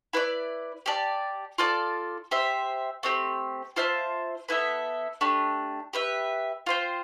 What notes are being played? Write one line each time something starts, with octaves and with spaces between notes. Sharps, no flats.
E4 B4 D5
G4 D5 A5
F4 A4 D5 A5
G4 C5 E5
A3 C4 G4
F4 C5 E5 A5
B3 E4 A4 E5
A3 D4 G4
G4 B4 E5
F4 C5 G5